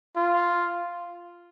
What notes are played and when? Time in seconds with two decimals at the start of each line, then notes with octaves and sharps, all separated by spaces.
0.17 F4